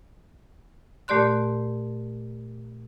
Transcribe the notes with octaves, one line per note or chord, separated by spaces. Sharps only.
A#2 A3 G4 D5 C6 F#6